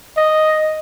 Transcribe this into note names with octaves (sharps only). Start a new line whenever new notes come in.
D#5